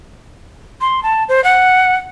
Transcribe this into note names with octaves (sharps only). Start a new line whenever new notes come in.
C6
A5
C5
F#5